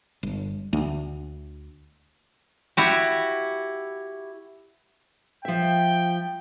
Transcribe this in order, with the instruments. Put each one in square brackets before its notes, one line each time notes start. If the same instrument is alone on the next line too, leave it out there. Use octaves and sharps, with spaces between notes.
[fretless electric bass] G1
D2
[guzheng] E4 F#4 G4
[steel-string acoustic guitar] F3 E5 [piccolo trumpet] G5